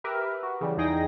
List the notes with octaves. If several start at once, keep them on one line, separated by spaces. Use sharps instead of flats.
G4 A#4 B4 E5
F#4
C#3 E3 G3
E2 D#4 G#4 G5 A#6